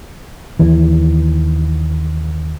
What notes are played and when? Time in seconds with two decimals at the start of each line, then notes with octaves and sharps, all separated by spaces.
0.59 D#2 E3